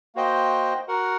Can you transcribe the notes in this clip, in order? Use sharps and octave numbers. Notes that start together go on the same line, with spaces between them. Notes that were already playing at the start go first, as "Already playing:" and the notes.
A#3 F#4 C5 D#5 G5
F#4 A#4 F#5